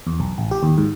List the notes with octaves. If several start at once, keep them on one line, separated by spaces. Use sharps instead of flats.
E2
B1
A1
G4
D#2
G#2